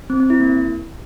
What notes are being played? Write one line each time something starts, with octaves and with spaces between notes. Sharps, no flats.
C4
C4
E4
A#3